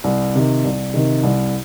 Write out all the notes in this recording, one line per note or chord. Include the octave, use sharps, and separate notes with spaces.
C2
C3 D#3
C2
C3 D#3
C2